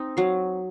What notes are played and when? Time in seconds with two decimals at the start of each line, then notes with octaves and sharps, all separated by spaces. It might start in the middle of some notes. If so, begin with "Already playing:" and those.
Already playing: C4 D#4
0.17 F#3 F5